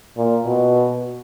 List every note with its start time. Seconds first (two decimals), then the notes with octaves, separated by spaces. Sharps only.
0.17 A#2
0.45 B2